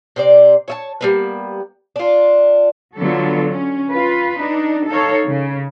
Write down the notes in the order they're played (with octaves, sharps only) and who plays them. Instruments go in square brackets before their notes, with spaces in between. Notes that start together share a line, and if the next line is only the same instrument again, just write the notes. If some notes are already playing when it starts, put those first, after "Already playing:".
[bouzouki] C3 C5 D5
C#5 E5 A5
G3 A#3 B3
D4 F4
[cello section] D3 F#3 B3 F4 A4
C#4
F4 B4
D4 D#4
D#4 A4 C#5 F5
C#3